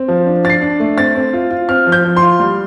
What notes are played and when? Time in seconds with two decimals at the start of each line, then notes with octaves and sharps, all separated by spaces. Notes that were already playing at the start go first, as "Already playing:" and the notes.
Already playing: C4
0.08 F3
0.26 D4
0.44 D4 A6
0.50 C7
0.62 D4
0.80 A3
0.98 C4 A6
1.16 C4
1.33 F4
1.51 F4
1.69 C4 F6
1.87 F3
1.92 G6
2.05 F3
2.17 C6
2.22 F4
2.40 G3